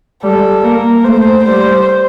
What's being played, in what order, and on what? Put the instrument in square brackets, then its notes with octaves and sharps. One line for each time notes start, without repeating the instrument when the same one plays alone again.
[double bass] G3 [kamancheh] A4
[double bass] A#3 [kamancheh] A#4
[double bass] A3 [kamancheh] C5
[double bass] G3 [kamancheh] C5